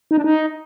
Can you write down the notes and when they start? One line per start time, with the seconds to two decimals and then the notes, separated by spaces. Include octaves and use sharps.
0.11 D#4
0.18 D4
0.24 D#4